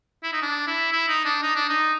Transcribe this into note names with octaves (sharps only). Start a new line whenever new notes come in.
E4
D#4
D4
E4
E4
D#4
D4
D#4
D4
D#4